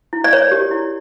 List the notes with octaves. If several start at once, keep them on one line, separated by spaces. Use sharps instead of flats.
E4
D5
A#4 C#5
G4
E4